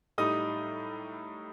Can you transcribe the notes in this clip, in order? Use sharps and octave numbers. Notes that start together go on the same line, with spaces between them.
A2 G3 D#4 D#6